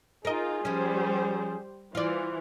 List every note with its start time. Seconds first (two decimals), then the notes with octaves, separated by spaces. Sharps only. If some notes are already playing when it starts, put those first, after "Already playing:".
0.25 D#4 F4 G#4 A#4 D#5
0.65 F3 G3 C#4 C5
1.95 E3 F4 C5 D5